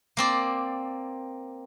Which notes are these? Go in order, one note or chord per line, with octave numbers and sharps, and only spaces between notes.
A#3 C4 D5